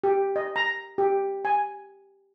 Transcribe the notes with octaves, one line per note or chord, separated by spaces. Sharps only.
G4
D#5
A#5
G4
G#5